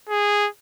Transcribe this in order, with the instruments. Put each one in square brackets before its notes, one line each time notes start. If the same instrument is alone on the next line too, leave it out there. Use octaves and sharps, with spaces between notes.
[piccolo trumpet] G#4